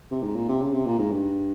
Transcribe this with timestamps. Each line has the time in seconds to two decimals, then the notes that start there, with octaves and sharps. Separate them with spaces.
0.11 C3
0.23 G#2
0.35 A#2
0.48 C3
0.61 C#3
0.73 C3
0.86 A#2
0.99 G#2
1.11 G2